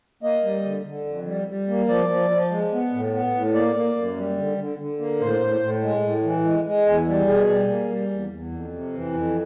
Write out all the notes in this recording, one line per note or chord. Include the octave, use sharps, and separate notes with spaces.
A#3 D#5
G3
D3
D3
F2
G3
G3
A#3
F3 D5
F3
F3
G#3
B3
A2
B3
A2
A#3 D5
A#3
F#2
G3
D3
D3
D3
A#3
A2 C5
A2
A2
G#3
A2
E3
G#3
G#3
E2 G#4
G3
B2 G#4
G3
A#3
G3
E2
E2
F2
C3
E3
F2